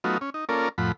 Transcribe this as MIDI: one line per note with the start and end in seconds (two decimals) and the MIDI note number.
0.04 0.18 54
0.04 0.18 57
0.04 0.18 59
0.04 0.18 63
0.04 0.18 65
0.04 0.18 66
0.21 0.30 61
0.34 0.45 63
0.49 0.69 58
0.49 0.69 61
0.49 0.69 65
0.49 0.69 69
0.49 0.69 70
0.49 0.69 74
0.78 0.92 41
0.78 0.92 45
0.78 0.92 53
0.78 0.92 78
0.78 0.92 83